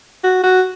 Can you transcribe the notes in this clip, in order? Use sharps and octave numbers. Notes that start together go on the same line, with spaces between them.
F#4
F#4